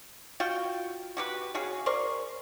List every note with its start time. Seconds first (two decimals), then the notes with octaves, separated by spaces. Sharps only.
0.40 F4 F#4 G5
1.17 F#4 G4 B4
1.54 C#3 F#4 G#4
1.86 A#4 C5 D5 C#6